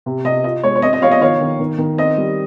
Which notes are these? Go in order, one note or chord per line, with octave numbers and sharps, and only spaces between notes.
C3
C3 D#5
F4 D#5
G#3 C#5
C#5
C4 D#5
D#5
F3 C#5 F5
D#5
D#3 C#5 F5
D#3
D#3
D#3
C4 D#5
G3